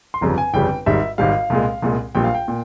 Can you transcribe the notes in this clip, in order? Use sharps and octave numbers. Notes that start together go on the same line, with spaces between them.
C6
G1 F2 C#3 G3 A#5
G#5
G1 F2 C#3 G3 G5
G#1 G#2 G3 E5
G#1 G#2 G3 F5
C2 A#2 G#3
C2 A#2 G#3
A#1 A#2 G3 G5
F5
G5
A#2